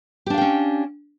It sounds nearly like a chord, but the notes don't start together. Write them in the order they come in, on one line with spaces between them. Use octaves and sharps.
G4 D4 F5 G5 C#4